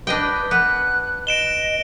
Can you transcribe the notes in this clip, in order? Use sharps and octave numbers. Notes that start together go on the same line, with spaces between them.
D4 B4 D#5 G5
B3 F#6
D#5 D7 E7 G7